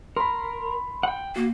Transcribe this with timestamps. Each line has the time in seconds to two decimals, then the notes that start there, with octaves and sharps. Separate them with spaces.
0.16 A#4 B5 C6
1.03 F#5 G5
1.36 A#3 F#4